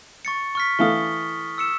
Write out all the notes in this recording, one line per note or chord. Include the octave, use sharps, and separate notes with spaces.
C#6 A6 C#7
C#6 F6 B6
E3 A3 F5 D#6 G7
E6 C#7 E7